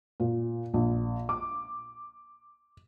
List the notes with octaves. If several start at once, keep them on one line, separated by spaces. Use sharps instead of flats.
A#2
A#1
D6